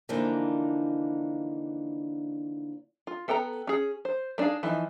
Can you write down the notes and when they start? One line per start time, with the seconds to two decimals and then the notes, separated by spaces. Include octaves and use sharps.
0.09 D3 E3 F3 A#3 D4 D#4
3.07 F4
3.28 B3 A4 G5 A5 A#5
3.67 C#4 G#4
4.05 C5
4.38 A3 D4 D#4 G#4 F5
4.63 E3 F3 D#4